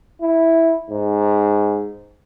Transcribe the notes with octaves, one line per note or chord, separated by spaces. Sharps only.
E4
G#2